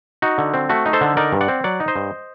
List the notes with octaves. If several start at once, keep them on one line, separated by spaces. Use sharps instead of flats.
D#4 F#4
D3
C4
A3 F#4
D#4
A4 C5
D3
D#4 A#4 D5
G2
D5 F#5
C4
F#3 D5 F#5
D#4
C5 D#5
G2